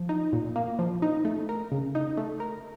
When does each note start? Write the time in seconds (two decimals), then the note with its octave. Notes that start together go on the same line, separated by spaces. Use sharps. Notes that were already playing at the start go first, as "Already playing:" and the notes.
Already playing: F3
0.09 D#4
0.33 A#2
0.56 A#3
0.79 F3
1.02 D#4
1.25 A3
1.49 A#4
1.72 C#3
1.95 D#4
2.17 A3
2.40 A#4